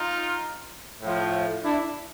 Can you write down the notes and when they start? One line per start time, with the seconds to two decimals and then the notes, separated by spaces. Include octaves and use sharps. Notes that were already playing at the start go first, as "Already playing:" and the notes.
Already playing: D#4 F4
1.02 A2 F3
1.64 D4 E4